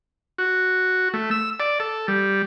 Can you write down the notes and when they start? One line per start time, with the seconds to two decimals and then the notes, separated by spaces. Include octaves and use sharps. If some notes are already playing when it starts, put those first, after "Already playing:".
0.38 F#4
1.14 A3
1.31 E6
1.60 D5
1.80 A4
2.08 G3